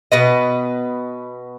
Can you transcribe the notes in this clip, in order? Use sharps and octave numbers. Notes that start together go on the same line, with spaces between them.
B2 B4 D#5